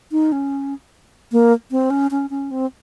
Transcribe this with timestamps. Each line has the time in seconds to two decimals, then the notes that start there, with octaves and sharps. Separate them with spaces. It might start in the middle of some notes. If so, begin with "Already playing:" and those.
0.12 D#4
0.32 C#4
1.32 A#3
1.71 C4
1.90 C#4
2.11 C#4
2.30 C#4
2.51 C4